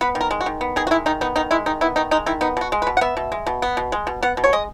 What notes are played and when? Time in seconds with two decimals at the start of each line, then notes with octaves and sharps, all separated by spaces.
0.01 B3 B4
0.15 D#3
0.21 A#4
0.31 G#3
0.41 F#4
0.46 D#3
0.61 B3
0.76 D#3 G#4
0.87 F#4
0.91 G#3 E4
1.06 D#3 D#4
1.21 B3 D#4
1.36 D#3 D#4
1.51 G#3 E4
1.66 D#3 D#4
1.81 B3 E4
1.96 D#3 D#4
2.11 G#3 D#4
2.26 D#3 E4
2.41 B3 D#4
2.57 B2 F#4
2.72 G#3
2.82 B4
2.87 B2
2.97 F#5
3.01 B3 E5
3.17 B2
3.32 G#3
3.47 B2
3.62 B3
3.77 B2
3.92 G#3
4.07 B2
4.23 B3 F#5
4.37 B2
4.44 C#5
4.53 G#3 D#5